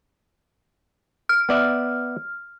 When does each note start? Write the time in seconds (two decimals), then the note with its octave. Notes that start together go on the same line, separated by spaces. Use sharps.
1.29 F6
1.49 B3 D5 E5